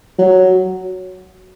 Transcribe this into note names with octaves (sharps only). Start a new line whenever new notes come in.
F#3